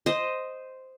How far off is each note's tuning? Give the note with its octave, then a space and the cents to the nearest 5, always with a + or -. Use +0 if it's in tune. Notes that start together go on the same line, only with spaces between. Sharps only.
C5 -5 D#5 +0